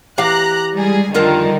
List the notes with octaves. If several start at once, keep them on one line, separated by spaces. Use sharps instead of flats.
E3 G4 F5 A#5 F#6
G3 G#3 G#4
F2 D3 D#3 G3 F4 A#4